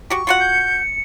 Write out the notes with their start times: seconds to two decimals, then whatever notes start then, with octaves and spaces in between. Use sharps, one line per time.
0.10 F#4 G4 C#6
0.27 F4 F#4 F#5 C#7
0.40 G6